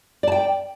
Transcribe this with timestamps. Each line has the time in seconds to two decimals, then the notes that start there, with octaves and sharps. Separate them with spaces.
0.23 D5
0.27 A5
0.32 G5